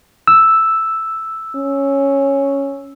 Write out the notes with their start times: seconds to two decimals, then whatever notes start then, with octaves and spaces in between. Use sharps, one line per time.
0.28 E6
1.56 C#4